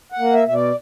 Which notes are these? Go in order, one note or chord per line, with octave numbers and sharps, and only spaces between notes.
F#5
A#3
E5
B2 E5
D5